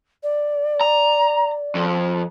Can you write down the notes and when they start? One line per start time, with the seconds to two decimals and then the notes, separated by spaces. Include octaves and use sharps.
0.23 D5
0.81 A#5
1.75 F2